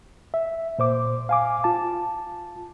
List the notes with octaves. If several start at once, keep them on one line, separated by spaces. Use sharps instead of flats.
E5
A#2 C5 D6
F5 G#5 D6
F4 A5